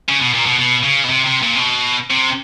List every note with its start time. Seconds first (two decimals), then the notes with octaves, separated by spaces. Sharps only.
0.09 C#3
0.21 B2
0.34 A#2
0.47 B2
0.59 B2
0.84 C#3
1.05 B2
1.10 C3
1.26 C3
1.43 A#2
1.56 C3
1.60 B2
2.10 C3